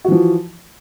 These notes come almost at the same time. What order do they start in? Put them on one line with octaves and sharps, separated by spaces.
F#4 E3 F3